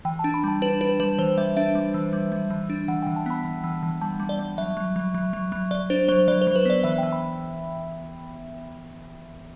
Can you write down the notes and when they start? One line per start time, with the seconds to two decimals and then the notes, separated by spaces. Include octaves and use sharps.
0.05 E3 G5
0.19 A5
0.24 D4
0.34 B5
0.43 G3 A5
0.62 D4 B4
0.81 D4 B4
1.00 G3 B4
1.18 E3 C5
1.37 G3 E5
1.56 D4 E5
1.75 G3
1.94 E3
2.13 G3
2.32 G3
2.50 E3
2.70 D4
2.88 E3 F#5
3.02 E3 G5
3.16 A5
3.26 B3 B5
3.45 E3
3.64 E3
3.83 E3
4.01 G3 A5
4.20 G3
4.29 D5
4.39 G3
4.58 F#3 E5
4.77 F#3
4.96 F#3
5.14 F#3
5.33 F#3
5.52 F#3
5.71 F#3 D5
5.90 D4 C5
6.08 F#3 C5
6.28 F#3 D5
6.41 C5
6.47 F#3
6.56 B4
6.65 B3 D5
6.84 E3 E5
6.98 E3 G5
7.12 B5